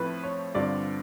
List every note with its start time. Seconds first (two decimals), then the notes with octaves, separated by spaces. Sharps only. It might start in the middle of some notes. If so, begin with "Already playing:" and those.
Already playing: A2 F3 A3 C4 E4 B4
0.24 C#5
0.55 G2 D3 G3 C4 F4 D5